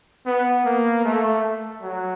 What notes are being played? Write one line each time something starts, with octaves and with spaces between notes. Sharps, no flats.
B3
A#3
A3
F#3